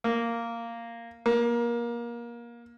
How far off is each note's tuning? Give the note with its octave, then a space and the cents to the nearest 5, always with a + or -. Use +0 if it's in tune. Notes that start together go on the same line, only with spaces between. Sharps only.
A#3 -5
A#3 +25